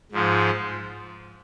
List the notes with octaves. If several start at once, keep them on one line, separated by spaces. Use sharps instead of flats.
G#2 F3 G#3